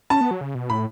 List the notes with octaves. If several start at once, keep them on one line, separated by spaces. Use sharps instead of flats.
C#4 A5
B3
F#3
C#3
B2
A2 B5